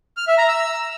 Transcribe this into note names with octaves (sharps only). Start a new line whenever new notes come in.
F6
E5
A#5
E6